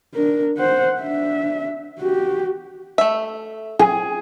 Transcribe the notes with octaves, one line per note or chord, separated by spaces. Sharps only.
D4 A#4
C5 F#5
D4 E5
F#4 G4
A3 E5
G#4